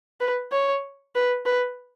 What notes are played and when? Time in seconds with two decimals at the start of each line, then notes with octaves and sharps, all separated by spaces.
0.20 B4
0.52 C#5
1.15 B4
1.46 B4